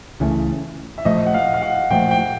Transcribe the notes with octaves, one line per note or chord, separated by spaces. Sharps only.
C#2 C#3 E3 A3
E5
A#2 F3 A3 D#5
F#5
F5
F5
F#5
A#2 F3 A3 G5
G5